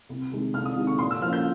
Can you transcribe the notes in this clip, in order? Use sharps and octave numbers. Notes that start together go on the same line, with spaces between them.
C2
C3 D#3 G#3
C2 F6
D#6
C3 D#3 G#3
C#6
A#2 C6
E6
F3 A#3 C#4 F6
G6